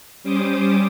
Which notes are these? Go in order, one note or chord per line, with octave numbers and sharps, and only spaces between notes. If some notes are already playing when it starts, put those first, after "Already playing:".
G3 C#4 C5 D6 D#6